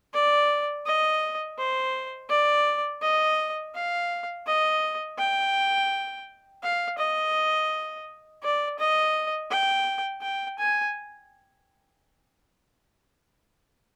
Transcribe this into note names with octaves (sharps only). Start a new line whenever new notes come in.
D5
D#5
C5
D5
D#5
F5
D#5
G5
F5
D#5
D5
D#5
G5
G5
G#5